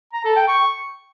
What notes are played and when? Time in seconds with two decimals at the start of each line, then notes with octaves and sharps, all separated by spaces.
0.13 A#5
0.25 A4
0.36 G5
0.48 C#6